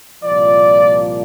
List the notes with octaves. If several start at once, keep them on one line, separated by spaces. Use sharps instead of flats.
C2 A#2 F3 D5